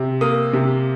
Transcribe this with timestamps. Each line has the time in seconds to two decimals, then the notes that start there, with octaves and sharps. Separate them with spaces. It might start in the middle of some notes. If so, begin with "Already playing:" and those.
Already playing: C3
0.21 A#3 D#6
0.53 C3